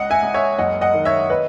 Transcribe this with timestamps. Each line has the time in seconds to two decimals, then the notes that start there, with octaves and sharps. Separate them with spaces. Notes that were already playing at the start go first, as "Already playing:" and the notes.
Already playing: C#2 D#5 F#5
0.10 E5 G#5
0.23 C#2
0.34 C#5 E5
0.58 F#1 D#5 F#5
0.81 D#5 F#5
0.94 D#3
1.05 C#5 E5
1.30 B4 D#5